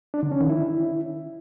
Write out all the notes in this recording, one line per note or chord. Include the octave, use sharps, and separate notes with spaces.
D4
D3
C#4
D#3
E4